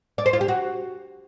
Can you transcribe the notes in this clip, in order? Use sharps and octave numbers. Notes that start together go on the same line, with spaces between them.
D5
C5
F4
G4
F#4